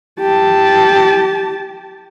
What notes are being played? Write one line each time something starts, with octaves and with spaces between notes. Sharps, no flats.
G4 A5